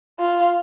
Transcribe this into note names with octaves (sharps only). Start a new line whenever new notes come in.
F4